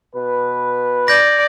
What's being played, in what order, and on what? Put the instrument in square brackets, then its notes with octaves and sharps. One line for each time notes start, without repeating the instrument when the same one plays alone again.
[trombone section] B2 B4
[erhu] D5 [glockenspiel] G6 A#6